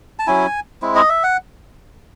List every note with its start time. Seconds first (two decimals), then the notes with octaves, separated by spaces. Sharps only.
0.19 A5
0.27 F#3 C#4 E4 G#5
0.82 G#3 C4 E4
0.95 D#5
1.09 E5
1.23 F#5